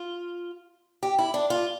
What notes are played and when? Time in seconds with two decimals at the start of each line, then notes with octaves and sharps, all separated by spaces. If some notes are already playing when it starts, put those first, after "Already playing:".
Already playing: F4
1.03 G4
1.19 E4
1.34 D4
1.50 F4